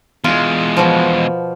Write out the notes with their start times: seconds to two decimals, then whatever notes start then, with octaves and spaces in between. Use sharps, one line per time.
0.24 E2 G#3 F4
0.77 B2 F3